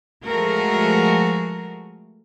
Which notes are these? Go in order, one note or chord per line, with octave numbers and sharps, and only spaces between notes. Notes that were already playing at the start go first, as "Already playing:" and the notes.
F3 G#3 A3 F#4 G#4 A#4